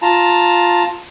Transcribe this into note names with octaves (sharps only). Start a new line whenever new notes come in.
F4 A5 A#5